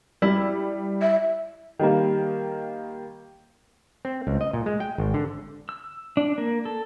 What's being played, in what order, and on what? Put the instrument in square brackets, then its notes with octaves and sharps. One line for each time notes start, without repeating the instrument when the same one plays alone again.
[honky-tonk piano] G3 [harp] E4
[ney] E5
[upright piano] D#3 G3 A#3
[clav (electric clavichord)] C4
C#2
D#5
A#2
G#3
G5
G#1
D3
[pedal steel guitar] E6
D4
A#3
A4